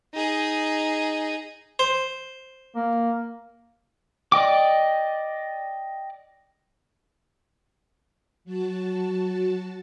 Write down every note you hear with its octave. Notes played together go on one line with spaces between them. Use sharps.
D#4 G#4
C5
A#3
D5 D#5 G5 D6
F#3 F#4 A5